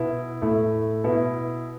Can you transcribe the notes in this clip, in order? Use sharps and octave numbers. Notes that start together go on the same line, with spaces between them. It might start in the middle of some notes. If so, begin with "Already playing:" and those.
Already playing: B2 B3 E4
A2 A3 E4
B2 B3 E4